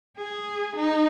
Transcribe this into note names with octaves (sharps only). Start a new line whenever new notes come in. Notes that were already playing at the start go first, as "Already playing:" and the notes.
G#4
D#4